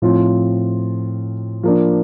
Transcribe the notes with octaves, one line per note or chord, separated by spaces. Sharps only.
A2 F3 C4 F4
F3 A#3 D4